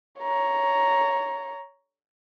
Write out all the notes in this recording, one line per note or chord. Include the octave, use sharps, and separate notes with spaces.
C#5 A#5